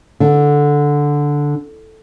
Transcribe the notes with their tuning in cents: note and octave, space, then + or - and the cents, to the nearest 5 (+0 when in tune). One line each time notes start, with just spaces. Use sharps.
D3 -5